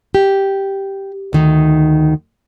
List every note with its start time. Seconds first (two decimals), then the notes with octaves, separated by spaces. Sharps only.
0.15 G4
1.33 D2 D#3 D#4